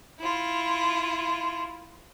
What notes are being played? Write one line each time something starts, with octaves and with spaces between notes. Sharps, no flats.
E4 F4